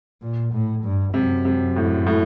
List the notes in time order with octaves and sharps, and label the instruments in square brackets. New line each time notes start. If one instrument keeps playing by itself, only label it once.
[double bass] A#2
A2
G2
[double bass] F#2 [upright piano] C3
[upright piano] C3
A2
A2